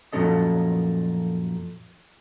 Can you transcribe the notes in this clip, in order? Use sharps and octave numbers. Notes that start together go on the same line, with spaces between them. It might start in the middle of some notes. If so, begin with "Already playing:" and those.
F#2 A#2 F3 C#4 A4 D#5